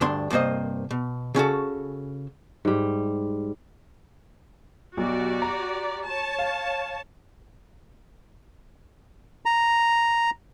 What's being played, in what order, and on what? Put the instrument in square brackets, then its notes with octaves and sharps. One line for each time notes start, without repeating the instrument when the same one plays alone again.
[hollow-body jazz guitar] D2 G2 D4 C6
C2 G2 A#3 C5 D#5
B2
C#3 C#4 F#4 A4
[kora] G#2 G3
[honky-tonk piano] B1 [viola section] F#4 G4 D5
[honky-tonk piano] A#5
[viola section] C#5 A5
[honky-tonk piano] F5
[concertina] A#5